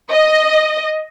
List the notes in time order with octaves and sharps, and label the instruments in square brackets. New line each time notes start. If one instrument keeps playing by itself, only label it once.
[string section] D#5